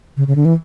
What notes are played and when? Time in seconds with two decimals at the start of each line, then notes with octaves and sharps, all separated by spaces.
0.17 C#3
0.27 C#3
0.36 D3
0.45 E3